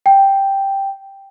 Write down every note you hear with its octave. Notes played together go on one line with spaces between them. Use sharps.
G5